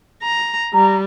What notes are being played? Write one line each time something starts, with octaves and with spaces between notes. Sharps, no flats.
A#5
G3 A#5